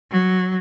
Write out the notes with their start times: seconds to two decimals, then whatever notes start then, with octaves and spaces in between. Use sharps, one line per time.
0.12 F#3